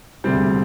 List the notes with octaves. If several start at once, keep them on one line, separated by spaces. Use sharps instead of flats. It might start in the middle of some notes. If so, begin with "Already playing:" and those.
E1 D2 C3 G3 C4